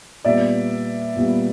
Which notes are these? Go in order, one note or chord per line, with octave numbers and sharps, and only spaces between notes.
A#2 G3 B3 D5 E5
A#2 G3 B3